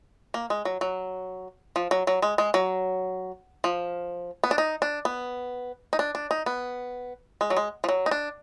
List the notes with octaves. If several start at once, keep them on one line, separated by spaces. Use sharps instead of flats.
A#3
G#3
F#3
F#3
F3
F#3
F#3
G#3
G#3
F#3
F3
B3
D4
D#4
D4
B3
D#4
D4
D4
D#4
B3
G#3
F#3
G#3
F3
F#3
D#4
D4